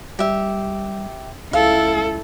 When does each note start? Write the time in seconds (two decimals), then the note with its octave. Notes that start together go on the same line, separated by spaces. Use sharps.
0.19 G3 G4 E5
1.53 C#2 E4 A4 F5